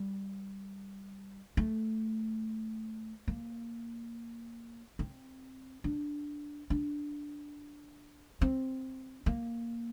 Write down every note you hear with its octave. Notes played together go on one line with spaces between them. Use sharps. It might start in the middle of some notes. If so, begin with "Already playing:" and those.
Already playing: G3
A3
A#3
C4
D4
D4
C4
A#3